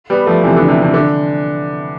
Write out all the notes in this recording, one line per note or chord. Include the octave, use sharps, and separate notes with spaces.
G3 B3
F3 A3
C3 E3
D3
C3
C3
D3